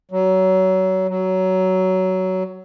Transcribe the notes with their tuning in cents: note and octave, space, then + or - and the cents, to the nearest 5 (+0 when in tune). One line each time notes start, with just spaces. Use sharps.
F#3 +25
F#3 +15